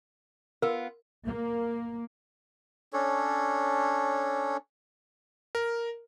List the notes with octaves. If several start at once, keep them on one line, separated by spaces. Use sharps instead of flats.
B3 F4 A#4 E6
A#3
C#4 D4 A4 C#5
A#4